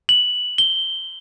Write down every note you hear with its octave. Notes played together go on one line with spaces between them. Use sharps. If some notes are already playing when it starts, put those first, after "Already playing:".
F#7
G7